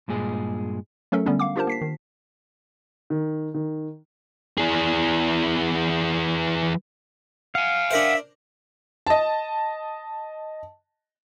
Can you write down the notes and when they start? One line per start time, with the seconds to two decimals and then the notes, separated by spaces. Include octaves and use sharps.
0.08 G2 A#2 G#3 G#4
1.12 F#3 A3 C#4 A4 A#4 E5
1.26 D3 G3 B3 C#4 D4
1.39 F5 F#5 D6
1.56 D4 F4 G4 A#4 C5 A5
1.67 A#3 B6 C7
1.81 D#3
3.10 D#3
3.54 D#3
4.58 E3 G#4
7.55 F5 F#5 G#5
7.91 D4 A#4 C5 E5
9.07 D#5 A5